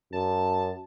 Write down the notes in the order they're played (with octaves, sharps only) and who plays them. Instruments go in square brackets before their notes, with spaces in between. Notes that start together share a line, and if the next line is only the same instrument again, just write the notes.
[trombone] F#2 [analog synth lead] A5